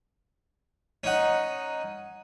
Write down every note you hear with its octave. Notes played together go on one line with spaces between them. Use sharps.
C#4 D#4 F#5